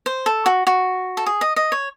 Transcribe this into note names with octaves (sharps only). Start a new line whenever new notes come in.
C5
A4
F#4
F#4
A4
G#4
D#5
D#5
C#5